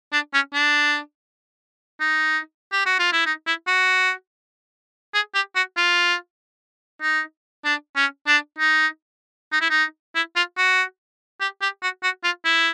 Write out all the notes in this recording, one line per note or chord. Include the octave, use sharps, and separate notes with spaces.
D4
C#4
D4
D#4
G4
F#4
F4
E4
D#4
E4
F#4
G#4
G4
F#4
F4
D#4
D4
C#4
D4
D#4
D#4
E4
D#4
E4
F4
F#4
G4
G4
F#4
F#4
F4
E4